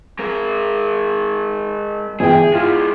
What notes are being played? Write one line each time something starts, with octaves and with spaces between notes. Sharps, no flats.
G#3 A#4
G1 E3 G#4 G5
G#3 E4 F4